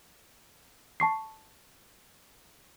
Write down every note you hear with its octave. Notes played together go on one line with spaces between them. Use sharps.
A5 C#6 C7